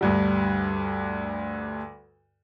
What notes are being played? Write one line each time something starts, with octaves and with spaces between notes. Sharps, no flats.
D2 G2 G3